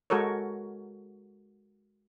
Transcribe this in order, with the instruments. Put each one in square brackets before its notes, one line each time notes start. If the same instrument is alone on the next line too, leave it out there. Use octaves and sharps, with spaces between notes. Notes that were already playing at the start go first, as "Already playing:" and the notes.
[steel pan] G#3 F#4 A4 A#4 C#5